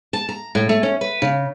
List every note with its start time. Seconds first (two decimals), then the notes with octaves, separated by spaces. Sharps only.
0.13 A5
0.29 A#5
0.55 A2
0.69 A3
0.83 C#4
1.01 B4
1.22 C#3